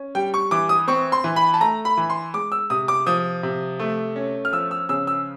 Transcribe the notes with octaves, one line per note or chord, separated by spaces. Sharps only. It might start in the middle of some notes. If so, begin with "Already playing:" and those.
Already playing: C#4
G3 G5
C#6
E3 D6
D#6
C4 C#6
C6
E3
B5
A5
A3 A#5
B5
E3
C6
G#3 D6
E6
C3 D#6
D6
F3 D#6
C3
A3
C#4
F6
F3 E6
E6
C#3 E6
E6